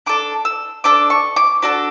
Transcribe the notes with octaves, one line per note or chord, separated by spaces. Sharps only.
D4 A4 D6
E6
D4 A4 D6
C#6
D6
D4 F#4 A4